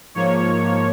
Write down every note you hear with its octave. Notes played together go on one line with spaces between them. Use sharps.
G#2 F3 A#3 C#5